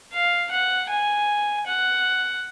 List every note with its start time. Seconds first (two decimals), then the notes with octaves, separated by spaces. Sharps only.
0.13 F5
0.51 F#5
0.90 G#5
1.67 F#5